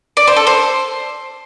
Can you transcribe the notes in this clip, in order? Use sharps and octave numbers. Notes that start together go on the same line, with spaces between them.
D5
C5
A4
C5